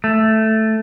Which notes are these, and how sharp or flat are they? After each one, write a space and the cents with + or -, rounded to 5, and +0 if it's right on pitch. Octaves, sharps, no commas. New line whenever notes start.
A3 +0